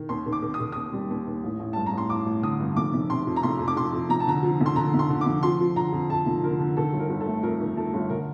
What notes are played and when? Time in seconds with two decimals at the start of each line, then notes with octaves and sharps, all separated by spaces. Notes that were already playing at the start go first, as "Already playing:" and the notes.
Already playing: D#3
0.09 D#2 C6
0.26 D#3
0.32 D6
0.42 D#3
0.54 D#6
0.60 D#3
0.72 D#2 D#6
0.93 G3
1.10 D#2
1.27 D#2
1.44 A1
1.59 A1
1.73 G2 A5
1.86 A#5
1.93 A1 C6
2.10 A1 D6
2.26 A1
2.43 D3 D#6
2.60 G2
2.76 F1 D6
2.94 F1
3.10 C3 C6
3.27 F2
3.36 A#5
3.43 F1 C6
3.59 F2
3.68 D6
3.76 F2 C6
3.93 F2
4.09 F1 A#5
4.20 A5
4.27 D3 A#5
4.43 F3
4.61 F1
4.66 C6
4.76 D3 A#5
4.94 F1
4.99 C6
5.10 D3
5.21 F1 D6
5.43 F3 C6
5.60 F3
5.76 D3 A#5
5.93 F2
6.10 F2 A5
6.26 F1
6.43 D3 A#4
6.60 D3
6.77 D#3 A4
6.93 G1
6.99 A#4
7.10 G1
7.21 A4
7.26 A3
7.43 F2 A#4
7.60 D#3
7.76 A3 A4
7.94 G1
8.10 D3 A#4